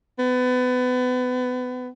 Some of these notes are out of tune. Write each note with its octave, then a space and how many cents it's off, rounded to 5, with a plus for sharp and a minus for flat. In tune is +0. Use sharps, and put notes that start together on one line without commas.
B3 +30